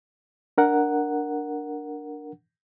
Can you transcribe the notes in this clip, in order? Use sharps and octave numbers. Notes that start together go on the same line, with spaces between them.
D4 A#4 F#5